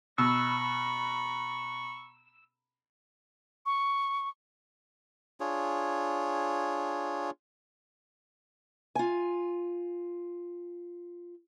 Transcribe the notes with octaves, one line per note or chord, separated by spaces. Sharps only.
B2 A#5 B5 C#6 E6
C#6
D4 F4 G#4 C#5
F4 G#5